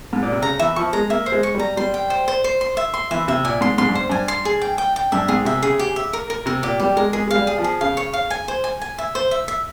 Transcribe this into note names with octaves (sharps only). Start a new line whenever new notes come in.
G#2
A#2
C3
C#3 A#5
E3 E5
F3 C#6
G#3 A#5
A#3 E5
C5
G#3
C#6
G3 A#5
G3 C6
G5
C5
C5
C5
C6
E5
C6
E3 E5
C3 E5
A#2 G#5
G#2 C6
G#2 C6
G2
C5
G2 G#5
C6
G#4
G5
G5
G5
G2 E5
G#2 G#4
C3 E5
C#3 G#4
G4
E5
A#4
A#4
C3 A#4
A#2 G4
G3 G4
G#3 A#4
G#3 G#4
G#3 F5
G3
G#4
F3
G#4
C#3 F5
C#5
F5
G#5
C5
G#5
G#5
E5
C5
E5
E5